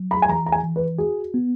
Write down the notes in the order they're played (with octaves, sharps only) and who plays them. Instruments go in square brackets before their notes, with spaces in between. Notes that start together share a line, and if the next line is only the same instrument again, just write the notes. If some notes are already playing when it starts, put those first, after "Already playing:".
Already playing: [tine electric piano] F#3
[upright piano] B5
G#5
[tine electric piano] E3 [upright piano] A#5
[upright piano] A#5
G#5
[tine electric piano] E3
[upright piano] B4
[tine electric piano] F#4 [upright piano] G#4
[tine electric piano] B3